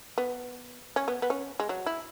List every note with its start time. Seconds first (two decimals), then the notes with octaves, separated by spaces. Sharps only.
0.18 B3
0.96 C#4
1.08 B3
1.22 B3
1.30 C#4
1.60 G#3
1.69 F#3
1.86 E4